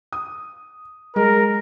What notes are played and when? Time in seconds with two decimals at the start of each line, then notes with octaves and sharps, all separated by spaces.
0.13 D#6
1.16 G#3 A#4